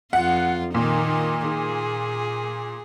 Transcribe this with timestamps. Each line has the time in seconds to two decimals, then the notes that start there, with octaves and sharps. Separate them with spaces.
0.13 F2 F4 F#5
0.75 A#2 D#3 D#4
1.48 G#4